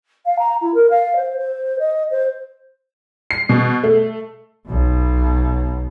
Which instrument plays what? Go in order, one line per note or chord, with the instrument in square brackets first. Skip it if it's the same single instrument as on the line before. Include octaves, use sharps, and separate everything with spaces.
[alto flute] F5
A#5
E4
A#4
F5
C5
C5
D#5
C5
[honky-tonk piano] C7
B2
A3
[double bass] B1 B2